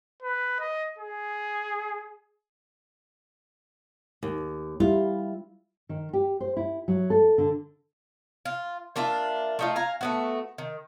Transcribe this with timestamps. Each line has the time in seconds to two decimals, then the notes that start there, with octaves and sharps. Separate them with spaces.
0.23 B4
0.60 D#5
0.98 G#4
4.23 D#2
4.80 G3 E4 F4
5.89 D#3
6.13 G4
6.40 C5
6.57 E4
6.88 F#3
7.10 A4
7.38 D3
8.45 F4
8.96 A#3 D4 F4 E5
9.59 A3 D#4 F4
9.76 F5 G#5 A#5
10.01 A3 B3 F#4
10.58 D#3